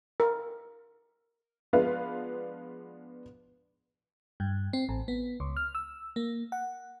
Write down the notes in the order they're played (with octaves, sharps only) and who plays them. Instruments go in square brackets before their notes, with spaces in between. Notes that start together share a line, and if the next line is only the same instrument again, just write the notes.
[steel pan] A#4
[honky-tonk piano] F3 G#3 B3 D4 B4 F5
[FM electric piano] G2
C4
A1
B3
C#2
F6
E6
A#3
F#5